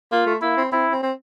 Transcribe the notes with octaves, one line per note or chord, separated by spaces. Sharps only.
A#3 F4
A3
A#3 E4
C4
C4 E4
C4
C4